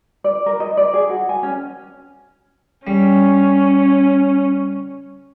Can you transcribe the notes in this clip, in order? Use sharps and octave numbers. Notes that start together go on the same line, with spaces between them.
D5
A#4
D#5
D5
G#4
F#4
G#5
C#4
G3 C#4